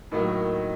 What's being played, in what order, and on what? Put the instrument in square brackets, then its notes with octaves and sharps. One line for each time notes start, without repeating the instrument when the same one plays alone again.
[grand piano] A2 F#3 A#3 [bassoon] D#3